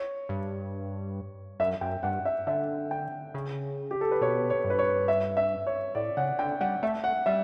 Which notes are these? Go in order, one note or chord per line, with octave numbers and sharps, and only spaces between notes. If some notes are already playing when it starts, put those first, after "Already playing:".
Already playing: C#5
G2
F#2 E5
F#2 G5
G2 F#5
E5
D3 E5
G5
C#3
G4
A4
B4
B2 C#5
C#5
G2
B4
C#5
E5
E5
C#5
A2 D5
C#3 F#5
D3 G5
G3 F#5
A3 E5
F#5
G3 E5